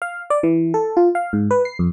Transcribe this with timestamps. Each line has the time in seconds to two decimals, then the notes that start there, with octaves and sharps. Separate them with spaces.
0.02 F5
0.30 D5
0.43 E3
0.74 A4
0.97 F4
1.15 F5
1.33 G#2
1.51 B4
1.65 C7
1.79 F2